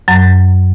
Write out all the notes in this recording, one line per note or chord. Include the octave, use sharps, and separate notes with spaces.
F#2 F#3